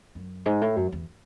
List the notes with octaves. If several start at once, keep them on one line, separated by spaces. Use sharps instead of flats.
F#2
G#2
A2
F#2
E2